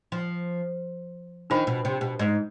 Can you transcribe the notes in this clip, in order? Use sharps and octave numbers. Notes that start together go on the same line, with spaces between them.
F3
D#3 D4 F4 C5 G5 B5
B2
C3
B2
G#2